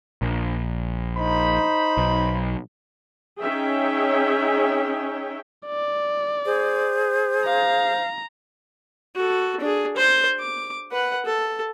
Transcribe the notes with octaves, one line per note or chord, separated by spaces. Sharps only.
A#1
D#4 C5 B5
B1
C#4 D#4 G#4 C#5 E5 G5
D5
G#4 C5
F5 A#5
F#4 A4
D4 G#4
C5
D6
B4 F#5
A4